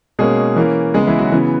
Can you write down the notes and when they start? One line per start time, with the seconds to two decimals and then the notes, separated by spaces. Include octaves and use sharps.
0.19 B2 G#3 A#3 C#4 G#4
0.56 E3 A#3 C#4
0.94 C#3 G#3 B3 G#4
1.07 E3 E4
1.19 F#3 F#4
1.32 C#3 E3 B3